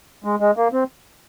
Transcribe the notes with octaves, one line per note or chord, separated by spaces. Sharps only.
G#3
G#3
A#3
C4